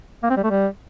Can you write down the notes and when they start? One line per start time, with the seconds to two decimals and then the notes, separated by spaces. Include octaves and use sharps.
0.23 A#3
0.30 C4
0.37 G3
0.44 A3
0.50 G3